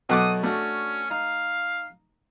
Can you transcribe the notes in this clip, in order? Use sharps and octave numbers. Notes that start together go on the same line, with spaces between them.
B2 F#3 A3 F#5 D6 D#6
A3 C#4 D4 F#4
D#4 F5